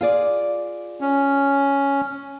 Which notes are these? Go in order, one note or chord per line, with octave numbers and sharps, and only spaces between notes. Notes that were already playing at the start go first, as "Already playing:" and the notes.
F4 G#4 D5
C#4